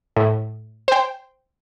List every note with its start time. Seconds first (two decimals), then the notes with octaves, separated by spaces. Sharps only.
0.17 A2
0.88 C5 G5